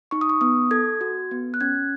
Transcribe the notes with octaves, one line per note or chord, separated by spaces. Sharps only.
D#4 C#6
D#6
C#6
B3 D#6
A4 G#6
F#4
B3
F#6
C#4 G#6